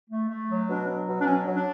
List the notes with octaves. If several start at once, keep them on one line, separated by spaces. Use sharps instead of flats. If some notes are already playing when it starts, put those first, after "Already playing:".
A3
A3
F#3
B2 D4
F#3
B2
D4
F#3 C#4
F#3
D4